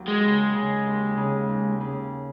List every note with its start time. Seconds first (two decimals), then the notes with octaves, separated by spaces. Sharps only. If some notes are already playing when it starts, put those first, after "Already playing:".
Already playing: D#2 F#3
0.08 G#3
0.24 C#3
0.55 C#3
0.86 D#2
1.17 C#3
1.49 D#2
1.80 C#3